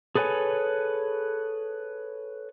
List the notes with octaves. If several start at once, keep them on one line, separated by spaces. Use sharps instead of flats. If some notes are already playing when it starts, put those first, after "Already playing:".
G#4 A4 B4 C#5 G#5